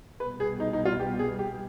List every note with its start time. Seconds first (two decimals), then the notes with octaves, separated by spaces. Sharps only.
0.20 C2 B2 G3 B3 B4
0.40 G#4
0.60 D#4
0.73 D#4
0.85 F4
0.99 G4
1.19 G#4
1.39 G4